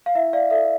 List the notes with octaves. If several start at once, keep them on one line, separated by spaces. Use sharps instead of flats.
F5
E4 E5
D5 F5
A4 D5 E5